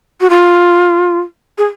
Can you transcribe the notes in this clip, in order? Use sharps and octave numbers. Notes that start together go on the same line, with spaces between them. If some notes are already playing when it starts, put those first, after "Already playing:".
F#4
F4
G#4